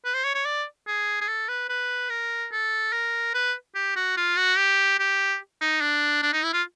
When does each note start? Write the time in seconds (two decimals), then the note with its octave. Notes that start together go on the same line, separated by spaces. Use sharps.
0.05 B4
0.14 C5
0.24 C#5
0.35 C#5
0.45 D5
0.87 G#4
1.21 G#4
1.28 A4
1.48 B4
1.69 B4
2.10 A#4
2.52 A4
2.93 A#4
3.34 B4
3.75 G4
3.96 F#4
4.17 F4
4.37 F#4
4.57 G4
4.99 G4
5.61 D#4
5.81 D4
6.22 D4
6.33 D#4
6.44 E4
6.53 F4